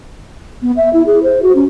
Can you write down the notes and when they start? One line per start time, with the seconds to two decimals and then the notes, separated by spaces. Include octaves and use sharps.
0.62 B3
0.77 E5
0.93 E4
1.07 G#4
1.23 C5
1.43 F#4
1.55 C#4